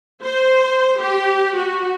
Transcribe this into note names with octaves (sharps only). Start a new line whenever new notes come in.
C5
G4
F#4